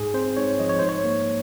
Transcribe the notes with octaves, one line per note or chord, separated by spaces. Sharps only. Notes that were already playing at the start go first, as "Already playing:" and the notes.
Already playing: G#2 G#4
C4 C5
G#2 C#5
F3 D#5
C#5
G#2 C5
C#5
A#3